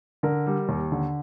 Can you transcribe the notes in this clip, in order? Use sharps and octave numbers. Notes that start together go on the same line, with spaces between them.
D3 A#4
G3
D#2
D3